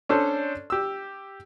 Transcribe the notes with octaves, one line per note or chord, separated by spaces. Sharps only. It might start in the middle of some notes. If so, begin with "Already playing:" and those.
C#4 D4 A4 C5 C#5
G4 E6